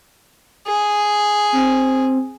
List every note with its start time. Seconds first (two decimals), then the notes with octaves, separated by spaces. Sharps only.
0.67 G#4
1.52 C4